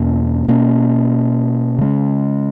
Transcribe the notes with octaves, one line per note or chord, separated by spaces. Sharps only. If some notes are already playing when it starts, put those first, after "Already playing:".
Already playing: E2 B2 A#3 C#4
B2 A#3 C#4
C#3 G#3 C#4